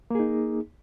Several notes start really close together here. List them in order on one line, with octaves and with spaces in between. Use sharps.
A#3 G#4 D#4